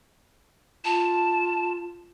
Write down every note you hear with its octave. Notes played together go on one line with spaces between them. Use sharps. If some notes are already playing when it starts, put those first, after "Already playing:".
F4 A5